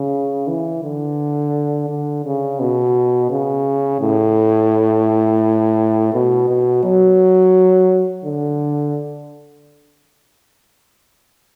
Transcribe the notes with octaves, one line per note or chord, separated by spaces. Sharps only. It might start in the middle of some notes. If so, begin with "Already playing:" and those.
Already playing: C#3
E3
D3
D3
C#3
B2
C#3
A2
B2
B2
F#3
D3